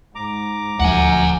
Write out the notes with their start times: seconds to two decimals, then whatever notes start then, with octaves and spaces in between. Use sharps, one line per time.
0.15 G#2 A#5 D6
0.80 D#1 D2 F3 F#5 G#5